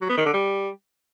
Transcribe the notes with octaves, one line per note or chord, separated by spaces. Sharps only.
F#3
B3
D#3
D3
G3